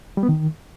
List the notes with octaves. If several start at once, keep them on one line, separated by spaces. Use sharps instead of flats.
G3
B3
D#3